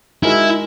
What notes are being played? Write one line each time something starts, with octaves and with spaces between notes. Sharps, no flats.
G#3 D#4 E4 F#4 A#4